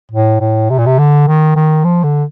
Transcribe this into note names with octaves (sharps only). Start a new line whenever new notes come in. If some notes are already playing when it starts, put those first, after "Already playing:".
A2
A2
C3
A#2
C3
D3
D#3
D#3
F3
D3